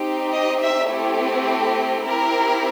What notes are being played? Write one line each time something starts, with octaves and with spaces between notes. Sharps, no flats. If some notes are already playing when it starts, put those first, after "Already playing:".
Already playing: C4 D#4 G4
D#5
E5
A3 C4 E4 G4
C4 E4 G4 A#4